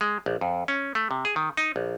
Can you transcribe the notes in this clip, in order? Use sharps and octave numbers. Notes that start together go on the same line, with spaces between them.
G#3
A#1
F2
C#4
A3
C3
G#4
D#3
D#4
A#1